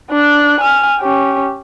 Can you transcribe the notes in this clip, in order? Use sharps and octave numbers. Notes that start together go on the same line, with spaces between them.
D4 F#6
G#5 F6
C#4 G4